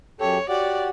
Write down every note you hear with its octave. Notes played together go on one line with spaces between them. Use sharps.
F#2 G4 A4 C#5
F#4 G4 D5 F#5